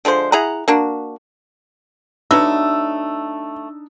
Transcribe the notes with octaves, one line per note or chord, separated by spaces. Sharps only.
D3 F3 G#3 C5
E4 G#4 F#5 A#5
A#3 D4 F#4
F#3 A3 B3 D4 D#4 E6